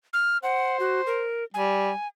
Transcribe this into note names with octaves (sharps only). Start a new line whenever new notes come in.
F6
C5 F#5
F#4
A#4
G3 G#5